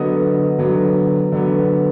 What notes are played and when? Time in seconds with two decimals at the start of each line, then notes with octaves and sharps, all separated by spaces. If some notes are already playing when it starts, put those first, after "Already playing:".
Already playing: D3 F#3 B3 D#5 D#6
0.59 D3 F#3 B3
1.32 D3 F#3 B3